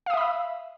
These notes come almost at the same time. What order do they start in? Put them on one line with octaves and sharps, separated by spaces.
F5 D#6 E5 B5 E6